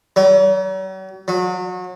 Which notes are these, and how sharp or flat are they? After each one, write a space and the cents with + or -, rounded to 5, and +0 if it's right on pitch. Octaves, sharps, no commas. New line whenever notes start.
F#3 +45
F#3 -30